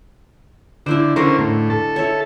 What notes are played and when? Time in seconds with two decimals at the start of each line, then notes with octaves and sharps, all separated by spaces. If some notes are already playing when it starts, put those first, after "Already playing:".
0.86 D3 D4 E4 C5
1.16 D3 C#4 D4 A#4 C5 D5
1.39 A2
1.70 A4
1.96 C#5 E5